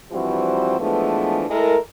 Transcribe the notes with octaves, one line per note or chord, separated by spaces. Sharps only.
G2 E3 F3 G3 C4 F#4
E3 F3 G#3 A3 B3 D4
G#3 A3 E4 A4 A#4